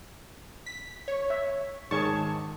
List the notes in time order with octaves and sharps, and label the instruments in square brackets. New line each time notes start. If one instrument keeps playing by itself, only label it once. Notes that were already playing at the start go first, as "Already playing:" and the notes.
[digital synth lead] B6
C#5
[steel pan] E5
[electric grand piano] G#2 D#3 [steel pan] G#4 C#5 C#6 [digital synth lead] A5